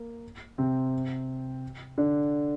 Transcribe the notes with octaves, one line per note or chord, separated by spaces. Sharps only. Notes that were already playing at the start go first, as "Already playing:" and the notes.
Already playing: A#3
C3 C4
D3 D4